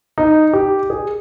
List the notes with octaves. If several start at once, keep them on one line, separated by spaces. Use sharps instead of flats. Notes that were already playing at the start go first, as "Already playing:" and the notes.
D#4
G4
G#4